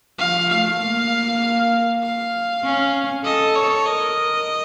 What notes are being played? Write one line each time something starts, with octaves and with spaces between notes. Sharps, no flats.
F3 F5
A3 F5
A#3
F5
C#4
A4 D#5
C#5
A#4 D#5